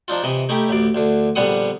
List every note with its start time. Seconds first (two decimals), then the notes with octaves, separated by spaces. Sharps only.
0.08 F3 D4 D#4 F4
0.23 C3 E3 D#5
0.49 A3 D#4 E4 G4
0.69 A1 D2 D5
0.95 D2 D3
1.35 A#1 D3 G3 B3 F#5 D#6